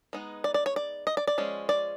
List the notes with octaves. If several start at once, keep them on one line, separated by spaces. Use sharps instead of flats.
G#3 B3 D#4
D5
D5
C#5
D5
D#5
D5
D5
F3 G#3 C#4
D5